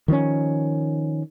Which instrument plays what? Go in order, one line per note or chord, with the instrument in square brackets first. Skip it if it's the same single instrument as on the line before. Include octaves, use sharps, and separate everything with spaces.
[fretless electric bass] D#3 F3 C4 C#4